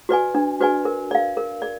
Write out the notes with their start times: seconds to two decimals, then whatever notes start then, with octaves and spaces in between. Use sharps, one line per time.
0.09 F#4 B4 D5 G#5
0.35 D4
0.60 F#4 B4 D5 G#5
0.85 A#4
1.11 D5 F5
1.37 A#4
1.62 D5